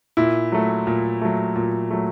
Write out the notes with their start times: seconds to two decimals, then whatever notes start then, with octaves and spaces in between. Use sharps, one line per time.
0.17 A#2 E4
0.52 F#3 A3
0.87 A#2
1.21 F#3 A3
1.56 A#2
1.91 F#3 A3